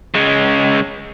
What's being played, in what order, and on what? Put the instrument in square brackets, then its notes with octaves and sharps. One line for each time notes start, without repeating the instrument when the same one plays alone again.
[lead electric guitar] C#3 G#3